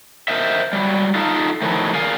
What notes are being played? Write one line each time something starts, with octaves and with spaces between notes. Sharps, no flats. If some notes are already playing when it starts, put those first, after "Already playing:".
A#4 C5 D#5 E5
F#3 G3
D#4 F4 A4
D#3 F3 F#3 A3 D#4 E4
G#4 A#4 D5 F5 G#5